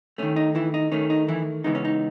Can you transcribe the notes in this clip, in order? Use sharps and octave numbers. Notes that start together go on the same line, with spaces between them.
D#3 A3 C#4
D#4
E3 E4
D#4
D#3 A3 C#4
D#4
E3 E4
C#3 E3 G#3 B3 D#4
C#4
D#4